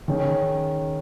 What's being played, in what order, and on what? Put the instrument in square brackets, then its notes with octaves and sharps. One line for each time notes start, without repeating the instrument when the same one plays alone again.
[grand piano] D#3 C#4 G#4